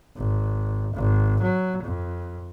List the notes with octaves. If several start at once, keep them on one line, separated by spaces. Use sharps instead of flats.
G#1
G#1
F#3
F2